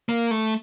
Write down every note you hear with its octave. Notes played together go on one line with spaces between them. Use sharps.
A#3
A3